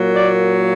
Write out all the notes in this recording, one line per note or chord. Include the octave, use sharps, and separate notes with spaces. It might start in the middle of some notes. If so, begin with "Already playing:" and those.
Already playing: A#2 F#3 A#3
D5